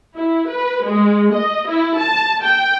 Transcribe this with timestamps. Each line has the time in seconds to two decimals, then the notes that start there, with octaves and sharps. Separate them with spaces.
0.15 E4
0.48 B4
0.86 G#3
1.34 D#5
1.68 E4
1.99 A5
2.43 G5